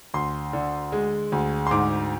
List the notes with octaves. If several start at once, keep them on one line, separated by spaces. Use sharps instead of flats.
D2 C6
D3
G#3
D2
C6
G#2 D6